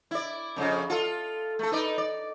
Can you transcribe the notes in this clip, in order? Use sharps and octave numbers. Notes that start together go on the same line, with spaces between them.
E4 D5
F2 A2 C#3
F4 A4
A3 A4
D#4 B4 D5
D5